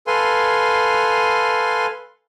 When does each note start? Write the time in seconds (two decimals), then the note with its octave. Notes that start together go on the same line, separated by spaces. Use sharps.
0.07 A4 B4 F5 G#5 C6